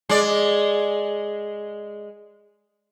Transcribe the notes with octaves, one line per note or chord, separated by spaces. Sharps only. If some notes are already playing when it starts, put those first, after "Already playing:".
G#3 D5